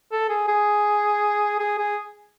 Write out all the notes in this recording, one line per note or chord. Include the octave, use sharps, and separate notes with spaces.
A4
G#4
G#4
G#4
G#4